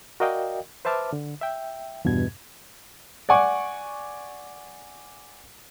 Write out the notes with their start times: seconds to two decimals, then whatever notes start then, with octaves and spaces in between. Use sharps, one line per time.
0.20 F#4 A#4 D5 D#5 F5 G5
0.85 B4 C5 E5 A5 D6 F6
1.13 D3
1.41 E5 G5
2.05 E2 G2 B2 G#6
3.29 D5 F#5 G#5 C#6 D6